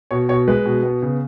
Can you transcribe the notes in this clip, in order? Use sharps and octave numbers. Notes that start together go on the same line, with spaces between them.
B2 C#5
B2 C#5
G#3 B4
B2
B3
C#3